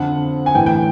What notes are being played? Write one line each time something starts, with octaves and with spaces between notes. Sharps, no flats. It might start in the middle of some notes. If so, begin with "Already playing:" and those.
Already playing: F2 D3 F3 F#5
G#5
A2 E3 G5
G5